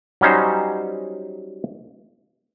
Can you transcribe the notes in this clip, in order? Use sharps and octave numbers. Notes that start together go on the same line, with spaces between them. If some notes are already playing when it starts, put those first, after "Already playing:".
F#3 G3 C#4 D#4 C5